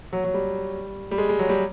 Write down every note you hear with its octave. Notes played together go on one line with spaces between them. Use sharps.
F#3
F#3
G3
G3
G#3
G#3
F#3
G3